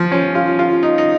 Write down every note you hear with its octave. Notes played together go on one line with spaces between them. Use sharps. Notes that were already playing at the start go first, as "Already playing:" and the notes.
Already playing: F3
C#4
F4
F4
D#4
D#4